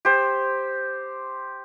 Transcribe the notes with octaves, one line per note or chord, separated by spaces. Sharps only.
G4 C5